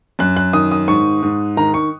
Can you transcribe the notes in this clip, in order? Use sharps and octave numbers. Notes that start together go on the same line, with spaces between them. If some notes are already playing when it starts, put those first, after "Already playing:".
F#2 F#6
F#6
D#3 D#6
D#6
G#2 C#6
G#2
D#3 A#5
C#6